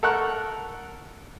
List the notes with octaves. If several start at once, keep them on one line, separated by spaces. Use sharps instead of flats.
A4 A#4 F#5 C#6 F#6